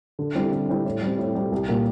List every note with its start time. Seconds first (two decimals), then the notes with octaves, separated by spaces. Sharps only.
0.19 D3
0.35 G3 C4 E4
0.52 D3
0.69 G3 C4 E4
0.85 A2
1.02 G3 C4
1.18 A2
1.35 G3 C4
1.52 C2
1.69 A#2 G3 A#3